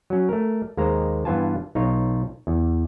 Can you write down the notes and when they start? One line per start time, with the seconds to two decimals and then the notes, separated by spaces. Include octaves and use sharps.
0.10 F#3 C#4
0.29 A3 A#4
0.77 D#2 G#3 A#3 C5 A#5
1.25 G2 E3 B3 F4 G#5 A5
1.75 B1 D#4 F4 C#5
2.47 E2